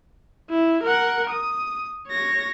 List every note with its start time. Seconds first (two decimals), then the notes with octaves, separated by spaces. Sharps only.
0.50 E4
0.83 A#4 F#5
1.30 D#6
2.08 C#5 A#6